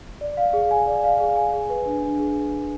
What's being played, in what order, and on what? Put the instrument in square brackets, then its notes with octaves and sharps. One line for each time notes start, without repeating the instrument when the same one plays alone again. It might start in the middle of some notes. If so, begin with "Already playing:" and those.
[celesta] D5
F5
G#4
G#5
D5
F5
G#4
G#5
G#4
B4
D4
D4
G#4